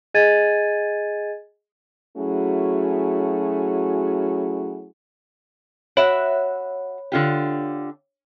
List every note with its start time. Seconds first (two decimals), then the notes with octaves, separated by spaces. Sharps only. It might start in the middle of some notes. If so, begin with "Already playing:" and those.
0.14 G#4 D#5 G#5 G#6 A6 D#7
2.17 F#3 A3 C#4 E4 F#4 G#4
5.97 F#4 C#5 E5 B5
7.12 D3 F4 G4